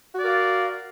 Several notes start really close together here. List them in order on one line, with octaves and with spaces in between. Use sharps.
F#4 D5 A#4 F5